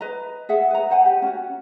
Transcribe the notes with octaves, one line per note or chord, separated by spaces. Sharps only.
B4 D#5 A#5
G#4 E5 F#5
B4 A#5
C5 F#5 G#5
G4
C#4 F#4